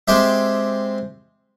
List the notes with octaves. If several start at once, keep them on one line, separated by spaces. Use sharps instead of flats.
G#3 C4 G4 E5